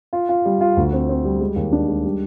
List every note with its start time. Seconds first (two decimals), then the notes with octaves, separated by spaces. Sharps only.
0.13 F4
0.29 F4
0.45 G3
0.61 F4
0.77 D2
0.93 C4
1.09 C4
1.25 G3
1.41 G#3
1.56 D#2
1.72 D4
1.88 G#3
2.05 G3